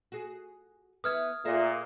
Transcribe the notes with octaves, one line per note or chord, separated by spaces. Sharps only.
F#4 G#4
B3 E4 D#6 F6 G#6
A#2 G#4 A#4 E5